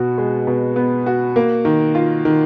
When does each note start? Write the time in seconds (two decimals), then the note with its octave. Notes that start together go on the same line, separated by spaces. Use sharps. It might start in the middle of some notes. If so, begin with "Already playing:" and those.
Already playing: B2 B3 F#4
0.18 G#3
0.47 B2
0.76 B3
1.06 F#4
1.36 A#3
1.65 D#3
1.95 F4
2.25 D#3